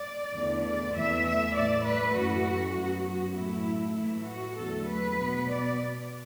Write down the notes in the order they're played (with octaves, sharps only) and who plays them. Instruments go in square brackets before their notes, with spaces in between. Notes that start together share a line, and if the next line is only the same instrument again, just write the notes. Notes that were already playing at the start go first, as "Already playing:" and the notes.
Already playing: [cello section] D5
E2 D3 A3
D5
E2 E3 A3 E5
E5
A2 A3 D5
B4
F#2 E3 A3 F#4
F#2 F#3 B3 F#4
F#4
A2 F#3 A3 E4
A2 E3 A3 E4
F#4
E2 D3 F#3 A3 A4
B4
B2 B3
D5